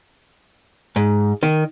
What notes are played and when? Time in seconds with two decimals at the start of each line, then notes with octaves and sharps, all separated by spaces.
0.96 G#2
1.43 D#3